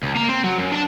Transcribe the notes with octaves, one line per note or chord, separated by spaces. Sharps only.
C#2
A#3 A#5
C4
F#3
F#2
D4 A5